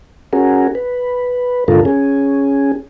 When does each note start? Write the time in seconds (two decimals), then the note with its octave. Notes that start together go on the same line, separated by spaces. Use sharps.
0.33 C#4 F#4 G#4 A#4
0.75 B4
1.68 G#2 D3 F4 A4 A#4
1.85 C#4 G#4